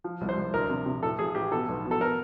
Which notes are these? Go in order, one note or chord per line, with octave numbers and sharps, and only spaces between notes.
F3
C2
C5
C2
D2 A#4
C3
C3
A2 A4
A1 G#4
A1 G4
B2 A4
B1
B2
A4
B2 A#4